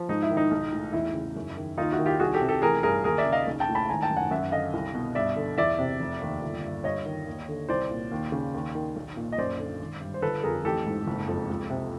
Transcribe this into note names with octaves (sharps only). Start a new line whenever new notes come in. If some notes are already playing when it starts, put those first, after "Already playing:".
Already playing: F3
G#2 D#4
E4
D#3
D#4
B1
A2
E2 E4
C#3
F#2
D#3
D#2 D#4 F4
E4 F#4
D#3
F4 G4
C2 F#4 G#4
G4 A4
C3
G4 A4
A1 G#4 A#4
G2 G#4 A#4
D#2 G#4 A#4
D5 E5
C#3
D#5 F5
B1
G5 A5
A2
A5 B5
G#1 G#5 A#5
G5 A5
F#2
F#5 G#5
F#2 E5 F#5
D3 D#5 F5
C2
B2
G2 D5 E5
D3
E2 D5 E5
C3
F1
D#2
G1
G2
G2 C#5 D#5
D#3
D#2
D3
C2 C5 D5
A#2
D#2
C#3
D#2
D#3
B1
A#2
D#5
F#2 C5 D5
D3
G#1
G2
C5
G1 A4 B4
F2 G#4 A#4
A1 G4 A4
G#2
F#1
F2
C#2
C3